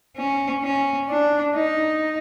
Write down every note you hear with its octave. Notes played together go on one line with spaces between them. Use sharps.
C#4
C#4
D4
D#4